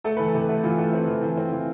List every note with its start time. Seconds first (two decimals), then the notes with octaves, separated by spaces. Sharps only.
0.04 A3 A4
0.17 E3 B4
0.29 A4
0.34 C3
0.49 A3
0.64 E3 F4
0.79 A3
0.93 C4
1.08 E3
1.23 E3
1.37 C4
1.52 E3